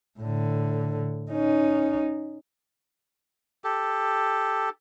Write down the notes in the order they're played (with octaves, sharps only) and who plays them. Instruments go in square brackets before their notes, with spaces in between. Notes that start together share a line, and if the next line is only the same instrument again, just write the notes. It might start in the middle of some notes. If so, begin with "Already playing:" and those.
[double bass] A2 D3
C#4 D#4
[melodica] G4 A4